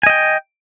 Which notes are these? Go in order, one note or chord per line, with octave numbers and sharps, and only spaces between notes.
D#5 G5 G#5